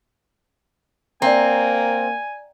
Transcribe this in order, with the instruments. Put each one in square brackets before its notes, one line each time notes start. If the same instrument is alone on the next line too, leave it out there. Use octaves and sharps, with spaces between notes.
[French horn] A#3 [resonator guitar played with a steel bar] C4 [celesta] D5 E5 A#5 [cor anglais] G#5